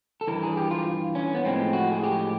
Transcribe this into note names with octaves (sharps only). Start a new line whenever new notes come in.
A4
G2 E3 A#4
G#4
G4
F4
C#4
B3
A2 F3 G#3 C4
F#4
G#4
G4